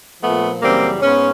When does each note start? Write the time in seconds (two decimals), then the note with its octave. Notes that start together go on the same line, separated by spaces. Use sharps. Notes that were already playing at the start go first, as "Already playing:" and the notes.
0.21 A#2 F3 A3 B3
0.61 F#2 C#3 E3 G3 A#3 C4
1.01 G#2 B3 C#4